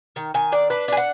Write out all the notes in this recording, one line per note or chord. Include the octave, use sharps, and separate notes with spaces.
D#3
D#3 G#5
D4 D5
D4 B4
D4 G#5
F#5